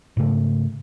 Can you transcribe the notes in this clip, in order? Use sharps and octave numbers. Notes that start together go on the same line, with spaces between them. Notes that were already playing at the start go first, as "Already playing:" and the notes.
G#2 C#3 A3